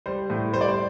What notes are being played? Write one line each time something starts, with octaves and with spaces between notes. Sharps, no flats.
G3 C5
A2
G3 C5
D5
C5